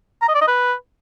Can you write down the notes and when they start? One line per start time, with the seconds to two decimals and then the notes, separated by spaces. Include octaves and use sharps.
0.22 A#5
0.28 D#5
0.35 D5
0.41 D#5
0.47 B4